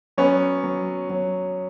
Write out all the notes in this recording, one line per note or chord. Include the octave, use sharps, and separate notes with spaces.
F#3 B3 C#4
F#3
F#3